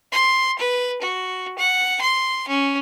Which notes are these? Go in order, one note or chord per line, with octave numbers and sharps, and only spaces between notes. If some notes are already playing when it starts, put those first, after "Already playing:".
C6
B4
F#4
F#5
C6
C#4